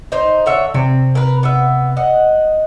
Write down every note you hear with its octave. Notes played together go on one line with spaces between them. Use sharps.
D#4 C5
D3 C#5 E5
C3 C4
A#4 B4
B3 E5
D#5 F#5